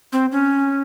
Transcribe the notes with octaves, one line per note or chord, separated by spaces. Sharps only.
C4
C#4